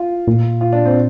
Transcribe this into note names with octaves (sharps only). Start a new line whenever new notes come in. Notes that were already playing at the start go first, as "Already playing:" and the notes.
Already playing: F4
A#2
F4
D4
C4